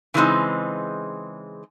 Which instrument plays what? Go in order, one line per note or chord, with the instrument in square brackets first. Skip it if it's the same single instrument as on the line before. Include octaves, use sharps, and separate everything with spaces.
[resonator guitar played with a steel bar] C#3 E3 G#3 C4 D#4